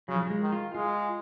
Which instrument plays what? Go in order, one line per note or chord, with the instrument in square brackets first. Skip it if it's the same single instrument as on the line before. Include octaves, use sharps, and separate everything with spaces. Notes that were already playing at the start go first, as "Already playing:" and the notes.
[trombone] C#3 [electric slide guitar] F#3
[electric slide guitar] F3
F#3
G#3
[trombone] D#3
[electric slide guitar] F4
[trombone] G#3 [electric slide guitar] F4